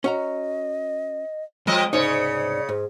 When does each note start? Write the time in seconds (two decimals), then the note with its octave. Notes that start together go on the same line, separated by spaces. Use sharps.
0.04 C#4 F#4 D#5 A#5
1.67 F3 G#3 C4 D#5
1.93 C2 G#2 C#3 D#4 C#5 D5
2.69 G#2 G#4